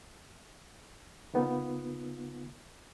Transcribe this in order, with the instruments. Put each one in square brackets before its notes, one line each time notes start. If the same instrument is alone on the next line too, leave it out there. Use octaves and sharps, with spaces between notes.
[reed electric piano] C#3 A#3 B3 D#4 F4